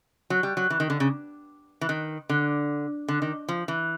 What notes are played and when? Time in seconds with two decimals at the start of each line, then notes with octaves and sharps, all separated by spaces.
0.30 F#3
0.43 G3
0.57 F#3
0.70 E3
0.80 D#3
0.90 D3
1.00 C#3
1.81 E3
1.89 D#3
2.30 D3
3.08 D3
3.22 D#3
3.49 F3
3.68 E3